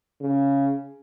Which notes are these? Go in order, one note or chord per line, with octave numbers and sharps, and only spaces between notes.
C#3